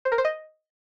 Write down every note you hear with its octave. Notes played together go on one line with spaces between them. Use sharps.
C5
A#4
C5
D#5